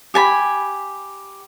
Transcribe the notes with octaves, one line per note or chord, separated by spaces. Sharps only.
G4 G#5 A5 B5